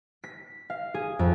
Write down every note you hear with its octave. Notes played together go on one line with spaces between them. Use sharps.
B6
F5
G#4
F2